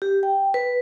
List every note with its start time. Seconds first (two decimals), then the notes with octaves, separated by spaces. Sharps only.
0.02 G4
0.23 G5
0.54 B4